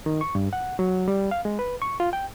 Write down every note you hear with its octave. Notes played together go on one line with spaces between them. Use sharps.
D#3
C#6
G2
F#5
F#3
G3
F5
G#3
B4
C#6
F4
G5